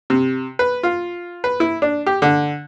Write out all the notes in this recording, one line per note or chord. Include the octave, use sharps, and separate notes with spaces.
C3
B4
F4
B4
E4
D4
G4
D3